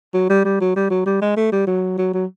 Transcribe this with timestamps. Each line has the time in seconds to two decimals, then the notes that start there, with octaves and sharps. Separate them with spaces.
0.14 F#3
0.30 G3
0.45 G3
0.61 F#3
0.76 G3
0.90 F#3
1.06 G3
1.21 G#3
1.37 A3
1.52 G3
1.67 F#3
1.98 F#3
2.14 F#3